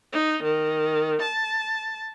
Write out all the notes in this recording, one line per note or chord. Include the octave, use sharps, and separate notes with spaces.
D#4
D#3
A5